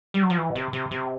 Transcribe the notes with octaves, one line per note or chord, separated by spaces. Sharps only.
G3
F#3
F3
E3
B2
C3
C3
C3